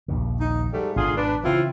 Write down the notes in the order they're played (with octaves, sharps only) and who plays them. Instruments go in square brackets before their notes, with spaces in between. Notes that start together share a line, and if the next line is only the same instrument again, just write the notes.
[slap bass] A#1 D#2 C#3
[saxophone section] D#4
G#2 G3 A3
[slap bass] G#1 G#2 B2 [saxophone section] D3 F4 G#4
[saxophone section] D4 B4
[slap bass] C#3 E3 [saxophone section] C4 E4 F4